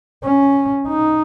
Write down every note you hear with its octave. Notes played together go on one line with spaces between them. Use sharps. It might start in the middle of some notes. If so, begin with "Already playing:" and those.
C#4
D#4